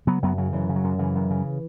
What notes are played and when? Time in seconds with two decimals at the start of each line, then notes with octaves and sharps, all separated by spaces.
0.07 C#3 F#3 B3
0.22 F#2 F#3 B3
0.38 C#3 F#3
0.53 F#2 E3
0.69 C#3
0.76 F#3
0.84 F#2
0.99 C#3 E3
1.15 F#2
1.30 C#3